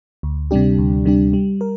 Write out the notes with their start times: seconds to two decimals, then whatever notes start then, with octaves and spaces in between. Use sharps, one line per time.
0.23 D2
0.51 C3 G3 D4 G4
0.78 D2
1.05 C3 G3 D4 G4
1.33 G3
1.61 A#4